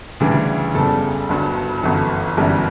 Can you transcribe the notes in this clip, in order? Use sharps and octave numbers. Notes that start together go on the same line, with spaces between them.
D2 C#3 E3 G3 D4
F#1 E2 C#3 G3 A4
G1 G2 F#3
G1 F#2 E3 A4
G1 F#2 E3 G3